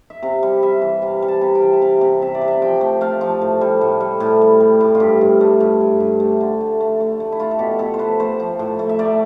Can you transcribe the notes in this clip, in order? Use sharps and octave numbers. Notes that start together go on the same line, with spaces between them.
E5
C3 F5
G3
G3 E5
E3
C3 F5
G3
A5
C3
G5
E3
E5
C3 F5
C3
C3 E5
D5
C3
E5
F3 G5
A3
A3 F5
F3
A2
G3
A2
G3
A2
G3
G3
A2
F4
G2 G4
G2
A3
G2
G2
G2
A3
D3
A3
A3
A3
A3
E4
A3 F4
A4
B2 G4
B2 A4
C5
A3 B4
A3 C5
F3
A2
A3
E5
A3 D5